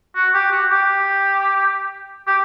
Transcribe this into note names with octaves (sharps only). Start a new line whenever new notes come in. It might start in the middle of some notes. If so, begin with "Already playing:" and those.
F#4
G4
F#4
G4
G4